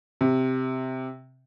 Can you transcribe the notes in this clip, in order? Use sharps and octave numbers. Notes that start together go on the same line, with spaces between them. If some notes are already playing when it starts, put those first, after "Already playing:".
C3